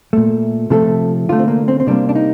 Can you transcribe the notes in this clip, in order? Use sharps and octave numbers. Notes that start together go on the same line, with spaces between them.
A#2 A3
C3 F3 A3 A4
D3 A3 F4
C4
A#3
C4
C4
C3 G3 A#3 D4
D4
D#4